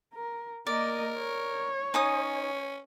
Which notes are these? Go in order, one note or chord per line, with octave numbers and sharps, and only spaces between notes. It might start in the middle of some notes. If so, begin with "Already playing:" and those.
A#4
A#3 A#4 D5 D#5
C#5
C#4 D#4 G#5 D#6